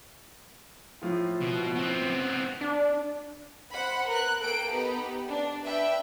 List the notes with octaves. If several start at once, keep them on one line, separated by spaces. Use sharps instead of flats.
A2 F3 F4
B2
B3 C4
D4
C5 F#5 B5
A#4 B4 F#6
A#3 A4 G5 D7
B3 D#4 G4 B4
D4
D4 B4 E5 G5